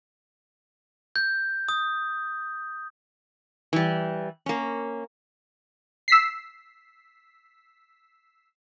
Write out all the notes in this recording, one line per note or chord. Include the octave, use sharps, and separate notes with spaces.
G6
D#6
E3 G3
A#3 C#4
E6 B6 C7